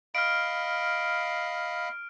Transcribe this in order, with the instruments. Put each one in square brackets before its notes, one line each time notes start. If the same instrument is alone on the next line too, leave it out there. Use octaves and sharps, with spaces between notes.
[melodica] D#5 F5 B5 [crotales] F6 D7